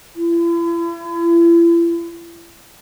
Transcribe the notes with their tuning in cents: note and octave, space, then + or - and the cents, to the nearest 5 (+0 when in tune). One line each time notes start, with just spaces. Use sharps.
E4 +40